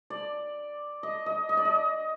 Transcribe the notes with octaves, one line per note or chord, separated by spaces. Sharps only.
D5
D#5
D#5
D#5
D5
D#5